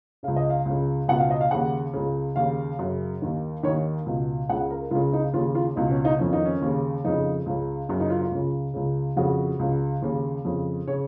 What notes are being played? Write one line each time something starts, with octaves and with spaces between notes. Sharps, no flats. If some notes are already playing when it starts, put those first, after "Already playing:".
C#2 C#3 F5
D#5
F5
C#2 C#3
C#2 B2 F#5
F5
D#5
F5
D#2 C#3 F#5
C#2 C#3
D#2 C#3 F5
F#2 C#3
D#2 D#3
D#2 D#3 C#5
C#2 B2
C#2 C#3 F#5
A#4
C#2 C#3 F4
D#4
D#2 C#3 F4
F4
C#2 B2 D#4
C#4
D#4
F2 D#3 C#4
D#4
C#4
D#2 C#3
F2 C#3 D#4
C#2 C#3
F#2 C#3 C#4
D#4
F4
F4
C#2 C#3
C#2 C#3
F2 C#3 F#4
C#2 C#3
D#2 C#3
F2 C#3
C#3 C#5